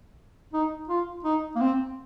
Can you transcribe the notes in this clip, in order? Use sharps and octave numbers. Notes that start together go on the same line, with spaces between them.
D#4
F4
D#4
A#3
C4